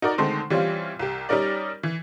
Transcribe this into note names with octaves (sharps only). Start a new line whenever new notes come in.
D#4 F#4 A#4 D5
D3 D#3 G#3 A3 C4
E3 G3 C4 C#4 F4
C2 G4
G3 C#4 D#4 A#4 D5
E3